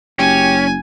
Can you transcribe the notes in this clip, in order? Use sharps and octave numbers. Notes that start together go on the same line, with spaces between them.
F#1 C#4 G4 G#5